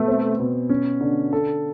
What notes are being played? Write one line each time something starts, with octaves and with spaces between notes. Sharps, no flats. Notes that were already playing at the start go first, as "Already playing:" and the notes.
Already playing: B2 A3 B3
C4
B2
C#4
D3
A4